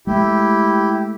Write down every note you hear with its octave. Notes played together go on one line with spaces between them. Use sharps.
G#3 A3 E4 G4